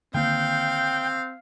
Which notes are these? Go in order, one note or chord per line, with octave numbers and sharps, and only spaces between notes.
D3 D#3 A#3 C4 F5 G5